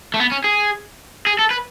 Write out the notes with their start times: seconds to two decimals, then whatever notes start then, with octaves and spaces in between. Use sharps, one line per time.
0.14 A3
0.20 B3
0.32 C#4
0.44 G#4
1.27 G#4
1.39 A4
1.51 B4